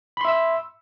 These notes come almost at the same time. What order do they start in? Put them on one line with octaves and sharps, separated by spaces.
B5 C6 E5 E6